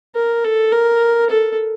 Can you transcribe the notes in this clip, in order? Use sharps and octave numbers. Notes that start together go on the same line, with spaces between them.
A#4
A4
A#4
A4